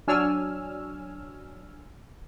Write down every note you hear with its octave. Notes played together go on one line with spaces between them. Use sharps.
F#3 D4 C#5 G#5 E6 F6